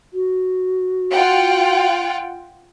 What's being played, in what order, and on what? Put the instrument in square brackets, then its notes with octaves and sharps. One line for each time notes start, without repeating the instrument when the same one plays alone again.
[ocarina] F#4
[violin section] F4 F#5 G5